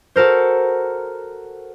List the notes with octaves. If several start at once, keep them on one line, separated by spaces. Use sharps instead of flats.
F#4 A4 A#4 C5